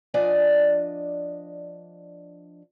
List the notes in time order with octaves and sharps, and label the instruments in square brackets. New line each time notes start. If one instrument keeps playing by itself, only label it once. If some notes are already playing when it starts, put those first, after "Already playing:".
[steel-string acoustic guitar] F3 D4 D5 D#5 G#5